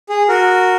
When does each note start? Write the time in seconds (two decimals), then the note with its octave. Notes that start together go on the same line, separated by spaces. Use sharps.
0.09 G#4
0.28 F#4 A#4